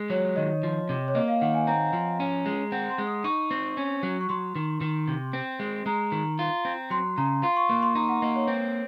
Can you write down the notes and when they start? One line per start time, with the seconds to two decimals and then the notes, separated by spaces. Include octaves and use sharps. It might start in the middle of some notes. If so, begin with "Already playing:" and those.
Already playing: G#3
0.10 F#3 C#5
0.36 D#3 D#5
0.63 F3
0.89 C3
1.08 C#5
1.15 A#3 D#5
1.28 F5
1.41 D#3 F#5
1.54 G#5
1.67 C4 A#5
1.93 F3
2.20 C#4
2.46 G#3
2.72 C4 F#5
2.90 C6
2.98 G#3
3.07 D#6
3.24 D#4 C#6
3.51 C4
3.77 C#4
4.03 F#3
4.21 C#6
4.29 F#3 C6
4.55 D#3
4.81 D#3
5.08 C3
5.33 C4
5.60 G#3
5.86 G#3 A#5
6.12 D#3
6.39 F4
6.65 C4
6.90 F#3 C6
7.18 C#3 A#5
7.43 F4 C6
7.56 C#6
7.69 A#3 C6
7.83 C6
7.95 D#4 A#5
8.09 F#5
8.22 A#3 D#5
8.36 C#5
8.48 C4